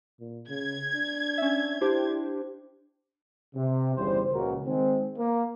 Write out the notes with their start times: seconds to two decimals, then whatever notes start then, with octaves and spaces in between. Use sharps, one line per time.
0.20 A#2
0.50 C#3 G#6
0.95 D4
1.38 C#4 E5
1.81 D4 E4 G4 C5
3.55 C3
3.96 G1 E2 C#3 G3 C5
4.33 C#2 A#2 C#3 F3 F#4 A#4
4.65 D#3 G#3 C4
5.17 A#3